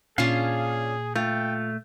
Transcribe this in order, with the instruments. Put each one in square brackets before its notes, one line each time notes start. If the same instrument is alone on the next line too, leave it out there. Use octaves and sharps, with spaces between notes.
[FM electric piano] A#2 [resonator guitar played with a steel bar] C#4 D4 F4 [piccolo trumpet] G#4 [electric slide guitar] F5
[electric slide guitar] A3 [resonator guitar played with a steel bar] F4 [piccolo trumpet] G5